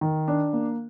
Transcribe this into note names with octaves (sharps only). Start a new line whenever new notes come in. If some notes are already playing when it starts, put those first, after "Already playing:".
D#3
D4
A#3